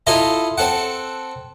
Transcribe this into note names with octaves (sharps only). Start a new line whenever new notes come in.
E4 F4 A4 D#5 A#5
C4 A4 F#5